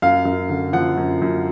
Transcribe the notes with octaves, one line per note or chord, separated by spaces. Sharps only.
F#2 F5
F#2
D3
F3 F#5
F#2
F#2